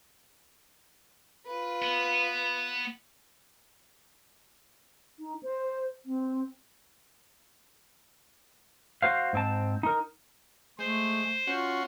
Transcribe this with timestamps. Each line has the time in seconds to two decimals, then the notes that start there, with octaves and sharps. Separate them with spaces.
1.47 F4 B4
1.82 B3
5.19 D#4
5.43 C5
6.06 C4
9.02 F#4 C5 F5
9.33 G#2 C4 A5
9.83 D#4 A#4
10.79 G#3 A3 C5
11.47 C#4 F4 F#4 C6